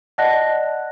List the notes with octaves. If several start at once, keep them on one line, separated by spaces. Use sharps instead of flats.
D5 D#5 F#5 A5 F#6 A#6